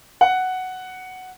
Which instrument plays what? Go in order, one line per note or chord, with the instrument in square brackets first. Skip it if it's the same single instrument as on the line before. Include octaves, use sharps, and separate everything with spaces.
[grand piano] F#5